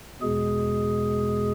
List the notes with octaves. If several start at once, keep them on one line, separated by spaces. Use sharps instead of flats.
E2 B2 G#3 G#4